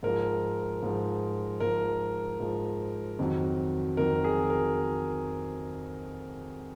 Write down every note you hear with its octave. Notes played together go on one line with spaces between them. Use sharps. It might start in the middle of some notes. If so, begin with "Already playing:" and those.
G#2 F3 A#4
G#2 F3
G#2 F3 A#4
G#2 F3
F2 D#3 F#3
F2 D#3 F#3 A#4
G#4
A#4